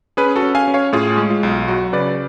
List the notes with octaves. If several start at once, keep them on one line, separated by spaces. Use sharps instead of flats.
C#4 G#4 B4
F#4 A4
C#4
F5 G#5
C#4
C#5 F5
A2 F4 G#4
G#3
F4
B1
F#3 F#4
C#3 B4 D5